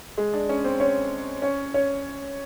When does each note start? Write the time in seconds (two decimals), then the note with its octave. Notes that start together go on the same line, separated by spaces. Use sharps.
0.18 G#3 G#4
0.34 D4 D5
0.49 C#4 C#5
0.64 C4 C5
0.80 C#4 C#5
1.42 C#4 C#5
1.74 C#4 C#5